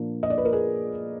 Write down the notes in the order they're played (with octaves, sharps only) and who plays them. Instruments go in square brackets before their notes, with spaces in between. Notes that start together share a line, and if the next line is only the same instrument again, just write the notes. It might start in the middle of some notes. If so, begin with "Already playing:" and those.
Already playing: [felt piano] A#2 F3 A#3 D4
D#5
D5
B4
A#4
G#4